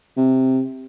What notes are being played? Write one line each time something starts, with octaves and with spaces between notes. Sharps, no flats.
C3